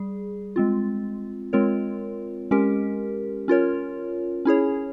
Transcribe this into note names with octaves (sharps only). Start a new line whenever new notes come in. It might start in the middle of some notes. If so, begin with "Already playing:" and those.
Already playing: G3 G#4
G#3 C4 F4
G#3 C4 F4 A#4 C#5
G#3 C#4 G4 A#4
C#4 F4 A#4 C#5
C#4 E4 G#4 C#5